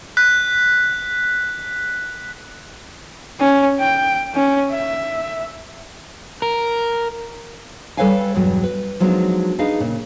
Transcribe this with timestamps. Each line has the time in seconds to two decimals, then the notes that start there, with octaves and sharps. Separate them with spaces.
0.17 F#6 B6
3.40 C#4
3.79 G5
4.34 C#4
4.71 E5
6.42 A#4
7.97 G3 A4 B4 C#5 F5 G#5
8.35 E2 G2 B2 F#3
8.63 B4
9.00 F3 F#3 G#3 B3 D4 D#4
9.59 D4 D#4 G#4 B4 D#5 F5
9.80 A#2 C#3